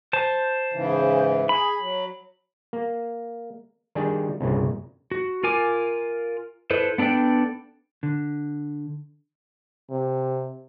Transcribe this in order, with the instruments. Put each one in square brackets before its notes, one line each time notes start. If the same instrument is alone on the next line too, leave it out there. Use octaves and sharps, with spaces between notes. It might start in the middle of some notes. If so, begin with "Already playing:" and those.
[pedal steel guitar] C5 A5
[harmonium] G#2 C#3 E3
[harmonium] G#4 [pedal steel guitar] B5
[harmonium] F#3
[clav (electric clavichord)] A#3
D#3 G3 D4 G4 G#4
C2 G2 A#2 C#3
[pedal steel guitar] F#4
F4 A#4 G#5 D6
E4 A4 B4 C5
B3 D4 A4 D5 G5
[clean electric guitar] D3
[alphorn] C3